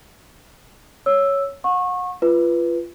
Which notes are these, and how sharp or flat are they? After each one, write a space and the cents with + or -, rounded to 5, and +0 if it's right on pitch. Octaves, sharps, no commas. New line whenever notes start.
C#5 +0 E6 +0
F#5 -35 C#6 -25
F4 -20 B4 -5